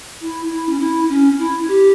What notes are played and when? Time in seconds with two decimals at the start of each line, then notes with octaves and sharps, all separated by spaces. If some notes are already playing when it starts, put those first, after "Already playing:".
0.21 E4
0.50 E4
0.69 C#4
0.80 E4
1.09 C#4
1.39 E4
1.68 G4